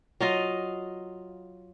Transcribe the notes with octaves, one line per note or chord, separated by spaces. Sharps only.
F#3 F4 D#5 F5